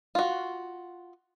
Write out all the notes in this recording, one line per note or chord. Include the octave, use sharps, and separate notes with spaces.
F4 F#4